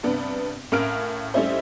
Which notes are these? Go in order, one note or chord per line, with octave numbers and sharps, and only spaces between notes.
G2 C3 B3 D4
A2 C#4 A#4 F5 F6 D7
G3 A3 C#4 D#4 E4 C5